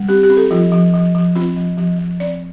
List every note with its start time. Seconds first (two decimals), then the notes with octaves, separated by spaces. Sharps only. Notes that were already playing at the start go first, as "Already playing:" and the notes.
Already playing: G3
0.09 C4 G4
0.23 G4
0.30 C4
0.37 A4
0.51 F3 F4
0.72 F3
0.94 F3
1.15 F3
1.35 C4 F4
1.56 F3
1.78 F3
1.99 F3
2.20 C4 D5